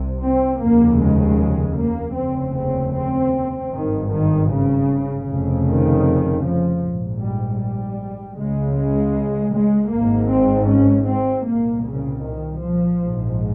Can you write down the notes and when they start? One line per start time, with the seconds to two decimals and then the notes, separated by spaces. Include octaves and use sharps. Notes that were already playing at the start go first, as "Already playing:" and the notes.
Already playing: C2 C3
0.23 C4
0.60 F1 D#2 C#3 A#3
1.00 G#3
1.77 A#3
2.16 F1 D#2 C#3 C4
2.54 C4
2.93 C4
3.72 G#1 G2 D#3
4.10 D#3
4.48 C#3
5.25 F1 F2 C#3
5.64 D#3
6.43 F3
6.80 A#1 G#2
7.20 G3
7.59 G3
8.36 C#2 C#3 G#3
8.75 G#3
9.53 G#3
9.91 G#1 G#2 A#3
10.30 C4
10.68 C#4
11.07 C4
11.45 C2 A#2 A#3
11.85 C#3
12.24 D#3
12.62 F3
13.01 A#1 G#2